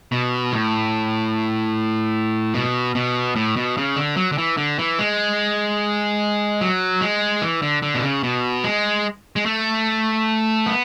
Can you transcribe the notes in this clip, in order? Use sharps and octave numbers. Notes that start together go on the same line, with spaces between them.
B2
A2
B2
B2
A2
B2
C#3
D3
F#3
D3
E3
D3
E3
G#3
F#3
G#3
E3
D3
D3
B2
C#3
B2
G#3
G#3
A3
B3